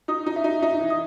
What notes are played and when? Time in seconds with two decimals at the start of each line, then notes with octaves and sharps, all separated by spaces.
0.08 D#4 D#6
0.26 D#4
0.36 E5
0.44 D#4
0.62 D#4 E5
0.80 E3
0.90 D#6